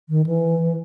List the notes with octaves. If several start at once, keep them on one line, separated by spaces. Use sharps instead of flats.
D#3
E3